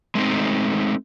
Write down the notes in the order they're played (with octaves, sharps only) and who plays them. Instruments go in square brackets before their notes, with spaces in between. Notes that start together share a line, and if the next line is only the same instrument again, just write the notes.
[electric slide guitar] G#3 A3 B3 C4 D#4